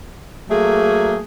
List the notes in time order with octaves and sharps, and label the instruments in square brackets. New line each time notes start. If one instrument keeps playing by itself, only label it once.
[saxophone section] F#3 A3 A#3 G#4